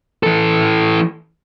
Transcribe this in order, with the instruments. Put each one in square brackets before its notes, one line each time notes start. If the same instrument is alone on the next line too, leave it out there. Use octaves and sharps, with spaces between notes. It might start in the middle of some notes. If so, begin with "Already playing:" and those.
[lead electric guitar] E3 A4